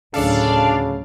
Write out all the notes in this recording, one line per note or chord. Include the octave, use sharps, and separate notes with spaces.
D2 A2 C#3 F#3 D4 A4 D5 F5